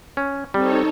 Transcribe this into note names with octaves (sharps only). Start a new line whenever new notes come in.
C#4
G3 C4 D#4 A4 C#5